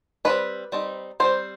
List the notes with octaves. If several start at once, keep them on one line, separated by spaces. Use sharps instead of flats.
G3 C4 D#4 B4
G3 C4 D#4
G3 C4 D#4 C5